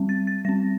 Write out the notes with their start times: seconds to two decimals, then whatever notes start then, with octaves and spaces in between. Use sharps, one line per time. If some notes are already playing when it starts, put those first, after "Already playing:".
Already playing: G3 C4
0.09 A6
0.27 A6
0.45 G3 C4 A#6